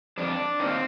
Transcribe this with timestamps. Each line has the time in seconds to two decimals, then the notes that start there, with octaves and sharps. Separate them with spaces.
0.18 F2 D4
0.60 D#3 A#3 C4